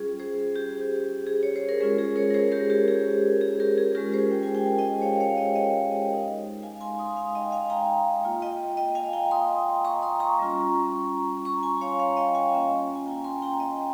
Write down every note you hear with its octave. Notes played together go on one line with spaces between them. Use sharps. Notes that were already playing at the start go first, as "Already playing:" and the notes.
Already playing: G3 C#4 F4 G#4
G#4 C5
G4
G#4
C#5
C5
A#4
G#3 C#4 F4 G#4
G#4
A#4 C#5
A#4
G#4 C5
G4 A#4
G4
G#4
G#4
G4 A#4
G#4
G#3 C#4 F4 G4 A#4
G#4 C5
G5
G#5
G5
G#5
D#5 G5
C#5 F5
C#5 F5
D#5 G5
D#5 G5
G#3 D#4
F5 G#5
G#5 C6
C6 D#6
F5 G#5
D#5 G5
F5 G#5
G5 A#5
A#3 F4
D#5 G5
D#5 G5
F5 G#5
G5 A#5
C6 D#6
A#5 C#6
C6 D#6
A#5 C#6
G3 C#4 F4
A#5 C#6
G#5 C6
C#5 F5
C#5 F5
D#5 G5
F5 G#5
A#3 C#4 F4
G#5
G5 A#5
G#5 C6
G5 A#5
D#5 G5